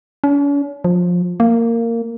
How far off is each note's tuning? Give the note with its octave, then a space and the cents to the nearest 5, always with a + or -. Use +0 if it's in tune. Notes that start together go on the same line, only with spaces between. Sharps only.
C#4 +45
F3 +20
A#3 -15